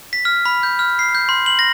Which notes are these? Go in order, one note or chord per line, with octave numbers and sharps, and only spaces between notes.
B6
F6
B5
G6
F6
C7
G6
C6
F#7
A#6